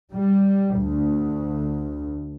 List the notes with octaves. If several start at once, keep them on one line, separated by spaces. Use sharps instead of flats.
G3
D2